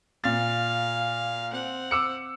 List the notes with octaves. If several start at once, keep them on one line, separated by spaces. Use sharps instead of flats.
A#2 F5 A6
C4 F#5
D6 E6 C#7